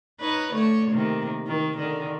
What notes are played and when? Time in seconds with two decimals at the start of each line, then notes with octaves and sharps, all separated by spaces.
0.20 D#4 B4 C#5
0.53 D3 A3 C#5
0.91 C3 D#3 A#3
1.47 D#3
1.77 D3 D#3